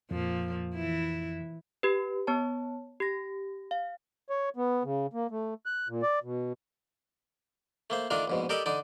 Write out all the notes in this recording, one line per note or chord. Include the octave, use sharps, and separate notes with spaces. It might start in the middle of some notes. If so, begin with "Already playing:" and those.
F2 A#2 F3
E3 E4
G4 B4
B3 C#5 A5
G4 A#6
F5
C#5
B3
C#3
A#3
A3
F#6
A#2
D5
B2
A3 A#3 C5
D#3 A3 D4 F4 A#4
A#1 G#2 B2
G4 A4 A#4 D5 D#5 B5
D3 D#4 D5